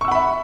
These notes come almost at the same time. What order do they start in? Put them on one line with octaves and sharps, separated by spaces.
C#6 E6 F#5 B5 E5